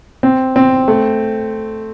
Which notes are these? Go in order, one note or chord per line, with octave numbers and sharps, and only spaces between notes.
C4
C4
A3